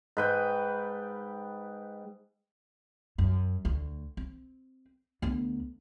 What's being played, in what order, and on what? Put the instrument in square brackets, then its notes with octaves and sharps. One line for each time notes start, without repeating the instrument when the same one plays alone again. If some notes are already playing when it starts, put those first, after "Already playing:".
[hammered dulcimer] G#2 B4 G5
[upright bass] F#2
D2
C4
D2 B3